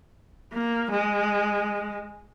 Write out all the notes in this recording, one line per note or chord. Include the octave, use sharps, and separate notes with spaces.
A#3
G#3